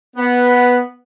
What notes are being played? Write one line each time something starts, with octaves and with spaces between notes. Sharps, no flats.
B3